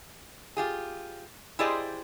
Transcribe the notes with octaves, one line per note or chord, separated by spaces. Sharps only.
F4 G4 G#4
E4 G4 G#4 C5 D5 D#5